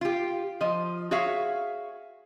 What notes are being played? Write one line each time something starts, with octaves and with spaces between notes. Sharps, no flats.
F4 G4
F3 D#5
F#4 G#4 C#5 E5 F5